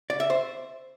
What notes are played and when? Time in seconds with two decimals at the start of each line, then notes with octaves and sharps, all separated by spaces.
0.10 D5
0.20 E5
0.30 C5